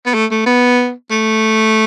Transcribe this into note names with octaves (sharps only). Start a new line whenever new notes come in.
B3
A3
A3
B3
A3